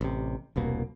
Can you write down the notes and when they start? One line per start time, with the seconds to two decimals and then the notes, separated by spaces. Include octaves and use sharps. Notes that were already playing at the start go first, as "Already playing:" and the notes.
0.01 A1 C3
0.56 E1 C2 B2 A#3